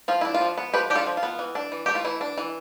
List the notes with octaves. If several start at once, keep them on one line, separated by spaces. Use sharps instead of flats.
F3 F4
D4 E4
F4
F3
B3
F3 G4 B4
D4 G4
F4 A4
F3
F4
B3
E3
D4
E3
A3 G4
F4
E3 E4
D4
E3